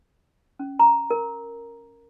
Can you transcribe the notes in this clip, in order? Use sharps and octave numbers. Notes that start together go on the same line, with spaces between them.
C#4
A#5
A#4